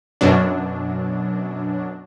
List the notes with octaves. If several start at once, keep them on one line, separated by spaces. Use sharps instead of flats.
F#2 B2 F#3 D4